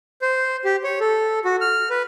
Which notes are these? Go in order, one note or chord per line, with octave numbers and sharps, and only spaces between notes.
C5
G4
C#5
A4
F#4
F6
B4